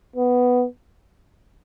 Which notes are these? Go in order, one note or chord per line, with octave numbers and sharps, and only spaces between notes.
B3